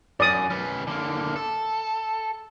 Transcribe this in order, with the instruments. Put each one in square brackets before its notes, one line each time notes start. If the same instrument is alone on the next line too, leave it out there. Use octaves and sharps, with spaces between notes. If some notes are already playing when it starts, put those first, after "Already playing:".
[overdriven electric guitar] F#2 [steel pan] D5 D#6
[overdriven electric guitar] C#4 B4
D3 A#3
A4